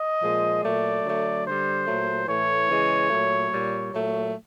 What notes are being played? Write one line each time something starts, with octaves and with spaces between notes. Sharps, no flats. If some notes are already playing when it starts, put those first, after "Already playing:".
Already playing: D#5
A#2 F3 G#3
A#2 F#3 A3 D5
D3 F#3 A3
D3 G3 C5
A#2 F#3 A3
A2 E3 A3 C#5
C#3 E3 G#3
A#2 F#3 A3
A#2 G3
A#2 F#3 A3